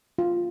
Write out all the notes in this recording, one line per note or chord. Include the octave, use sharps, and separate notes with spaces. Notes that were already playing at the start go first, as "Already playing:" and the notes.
F4